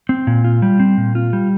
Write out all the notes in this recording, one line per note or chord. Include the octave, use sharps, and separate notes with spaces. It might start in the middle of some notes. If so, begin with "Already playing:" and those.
C4
A#2
F4
G3
C4
A#2
F4
G3